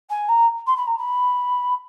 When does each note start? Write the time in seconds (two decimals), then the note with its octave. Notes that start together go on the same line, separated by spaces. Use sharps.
0.09 G#5
0.28 A#5
0.66 C6
0.76 B5
0.87 A#5
0.97 B5